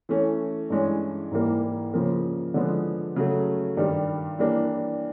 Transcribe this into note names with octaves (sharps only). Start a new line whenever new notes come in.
E3 A3 C#4
G2 E3 G#3 C#4
G#2 E3 G3 A#3
C#3 F3 A#3
D3 F3 G#3 B3
C#3 F#3 A3
G2 D#3 G3
E3 G3 A#3 D4